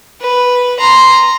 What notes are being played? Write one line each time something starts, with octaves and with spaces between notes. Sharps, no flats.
B4
A#5 C6